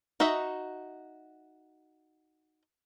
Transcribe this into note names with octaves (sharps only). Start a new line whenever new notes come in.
D#4 F#4 D#5 E5